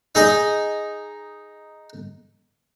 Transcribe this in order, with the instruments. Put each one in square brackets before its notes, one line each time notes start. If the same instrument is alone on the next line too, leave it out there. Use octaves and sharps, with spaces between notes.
[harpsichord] D#4 G#4 D#5